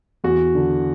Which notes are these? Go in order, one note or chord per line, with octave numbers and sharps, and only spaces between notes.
E2 F#4
D3